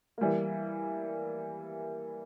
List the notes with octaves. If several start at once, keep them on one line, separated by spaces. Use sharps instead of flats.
E3 G3 A#3